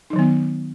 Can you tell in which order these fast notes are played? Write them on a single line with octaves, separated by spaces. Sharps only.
D#4 F#3 D#3 B3